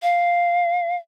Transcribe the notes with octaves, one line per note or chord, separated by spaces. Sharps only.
F5